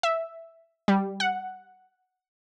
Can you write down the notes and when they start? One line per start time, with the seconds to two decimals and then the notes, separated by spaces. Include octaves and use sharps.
0.03 E5
0.88 G3
1.20 F#5